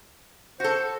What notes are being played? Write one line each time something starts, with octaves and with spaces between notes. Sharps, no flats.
F#4 A4 C5